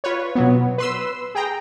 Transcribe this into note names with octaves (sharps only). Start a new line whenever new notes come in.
F4 B4 C#5
B2 F#3 B3
B4 C6 E6
G#4 G5 A#5